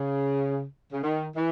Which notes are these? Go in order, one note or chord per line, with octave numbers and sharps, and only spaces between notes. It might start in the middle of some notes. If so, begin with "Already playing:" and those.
Already playing: C#3
C#3
D#3
E3